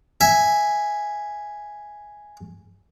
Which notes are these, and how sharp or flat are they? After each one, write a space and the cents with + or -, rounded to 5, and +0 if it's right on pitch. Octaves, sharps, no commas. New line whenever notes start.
E5 +0 G#5 +0